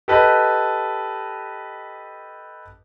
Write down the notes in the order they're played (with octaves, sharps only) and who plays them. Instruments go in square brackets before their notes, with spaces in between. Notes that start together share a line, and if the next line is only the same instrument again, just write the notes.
[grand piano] G4 A4 B4 D#5